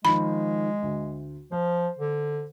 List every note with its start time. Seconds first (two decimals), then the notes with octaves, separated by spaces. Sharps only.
0.05 D#3 F3 G#3 B5
0.82 D2
1.52 F3 C5
1.99 D3